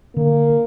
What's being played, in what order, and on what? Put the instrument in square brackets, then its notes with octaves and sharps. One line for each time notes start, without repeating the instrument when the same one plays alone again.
[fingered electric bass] D3 [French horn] A#3